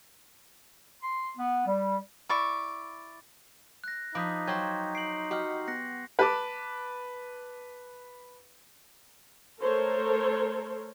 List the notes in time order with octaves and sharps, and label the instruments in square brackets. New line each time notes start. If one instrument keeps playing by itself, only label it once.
[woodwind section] C6
B3
G3
[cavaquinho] E4 D5 C#6
[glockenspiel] F#6 A#6
[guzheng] F3 [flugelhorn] D#4 [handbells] B5 D#6 [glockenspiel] D6 G6 B6
[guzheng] F#3 C5 [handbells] C#5 G5 G#6 [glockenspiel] C6 C#6 G6
[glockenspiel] C7 F#7 [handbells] D7
[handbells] F#4 D#5 F6 [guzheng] G4 F#5
[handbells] B3 [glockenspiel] F#6 A#6 C#7
[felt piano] B4 A5 D6
[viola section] A3 A4 A#4 C5 C#5